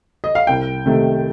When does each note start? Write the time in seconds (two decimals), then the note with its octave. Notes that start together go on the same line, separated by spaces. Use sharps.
0.24 D#5
0.35 F5
0.47 C2 G5
0.86 C3 D#3 A3